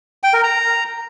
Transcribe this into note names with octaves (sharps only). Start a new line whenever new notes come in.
G5
A#4
A#5